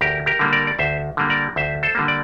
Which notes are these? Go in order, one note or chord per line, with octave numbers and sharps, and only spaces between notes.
D2 G4 A#4
G4 A#4
D3 G3 A#3
A#4 D5
D5
D2 C5 E5
D3 G3 A#3
A#4 D5
D2 C5 E5
A4 C5
D3 G3 A#3
D5